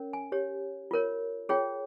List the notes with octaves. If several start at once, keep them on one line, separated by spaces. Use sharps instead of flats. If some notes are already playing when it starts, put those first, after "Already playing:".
Already playing: C#4 A#4 C#5
G#5
G4 C#5
F4 A#4 C#5
F4 G#4 C#5 G5